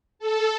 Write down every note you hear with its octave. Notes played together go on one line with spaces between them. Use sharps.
A4